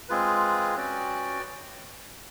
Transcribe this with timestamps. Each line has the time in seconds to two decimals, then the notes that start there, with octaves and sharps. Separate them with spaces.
0.09 G#3 C4 F4 G#4 B4
0.76 C#4 F#4 B4 D5 G5